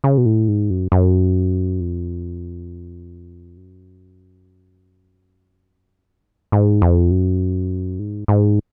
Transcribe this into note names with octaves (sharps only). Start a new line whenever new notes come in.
C#3
B2
A2
G#2
F#2
F#2
F2
F#2
G#2
G#2
F2
F#2
G#2
G#2